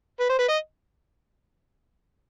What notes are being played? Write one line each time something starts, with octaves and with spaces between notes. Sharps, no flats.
B4
C5
B4
D#5